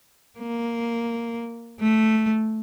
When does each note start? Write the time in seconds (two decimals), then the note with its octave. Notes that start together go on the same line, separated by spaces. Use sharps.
0.39 A#3
1.80 A3